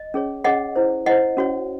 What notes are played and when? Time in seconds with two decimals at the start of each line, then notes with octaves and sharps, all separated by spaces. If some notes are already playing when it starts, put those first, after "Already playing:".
Already playing: D#5
0.14 C#4 G#4 C#5
0.44 C#4 G#4 C#5 D#5 F#5
0.76 E4 C5
1.06 E4 C5 D#5 F#5
1.37 C#4 F#4 C#5